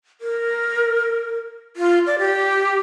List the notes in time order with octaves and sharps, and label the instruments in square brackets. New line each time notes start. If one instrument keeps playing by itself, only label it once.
[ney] A#4
F4
D5
G4